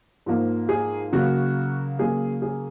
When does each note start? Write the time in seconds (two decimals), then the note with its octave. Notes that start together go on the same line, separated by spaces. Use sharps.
0.26 G#2 F3 A#3
0.69 G#4
1.12 C#3 F#3 A#3 F#4
1.99 C#3 F#3 A#3 G#4
2.42 G#4